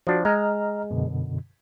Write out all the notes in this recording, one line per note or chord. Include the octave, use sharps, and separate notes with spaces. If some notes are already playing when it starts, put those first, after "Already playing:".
F3 D4 F#4
G#3 D#5 A#5 F6
F#2 B2 D3